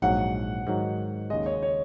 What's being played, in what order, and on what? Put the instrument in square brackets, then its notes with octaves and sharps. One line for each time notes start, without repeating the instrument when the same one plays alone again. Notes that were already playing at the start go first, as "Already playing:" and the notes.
[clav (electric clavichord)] A#1 G#2 F#3 [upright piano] F#5
[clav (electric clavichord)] G#2 D#3 F#3
[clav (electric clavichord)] D#2 C#3 G#3 [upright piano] D#5
[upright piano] C#5
C#5